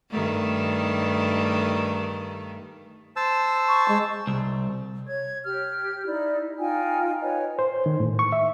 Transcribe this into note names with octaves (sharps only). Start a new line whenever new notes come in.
G2 D#3 A3
C5 A5 E6
C#6
G#3
C2
C#5 G#6
G4 F6
D#4 E4 D5
D#4 F4 G5 G#5
B4 C#5 D#5 G#5
C5
D#3
A2
C#6
E5